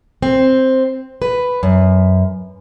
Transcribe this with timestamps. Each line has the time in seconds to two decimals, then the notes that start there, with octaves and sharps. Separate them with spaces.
0.22 C4
1.22 B4
1.63 F#2